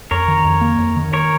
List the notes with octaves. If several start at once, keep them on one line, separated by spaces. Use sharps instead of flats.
F2 A#4 C#5
D#3
F2
A#3
F2
D#3
A#4 C#5